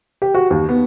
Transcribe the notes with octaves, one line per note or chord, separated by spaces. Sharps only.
G4
F#4
D#2
B3